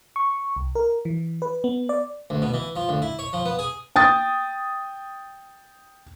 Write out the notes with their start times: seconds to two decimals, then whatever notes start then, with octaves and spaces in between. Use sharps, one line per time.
0.16 C#6
0.56 C2
0.75 A#4
1.05 E3
1.42 B4
1.64 B3
1.89 D5
2.30 D2
2.42 B2
2.54 E3
2.76 F3
2.89 D2
3.02 E4
3.19 C#5
3.33 F3
3.45 B3
3.59 G#4
3.96 G5 D#6 A6